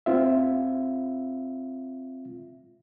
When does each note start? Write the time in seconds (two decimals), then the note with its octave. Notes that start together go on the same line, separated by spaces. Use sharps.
0.06 C4 F4 E5